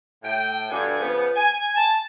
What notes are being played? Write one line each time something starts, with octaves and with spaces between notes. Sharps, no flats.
A2 G5
G2 B2 D4 A4 G#5
C#3 F3 B3
G#5
A5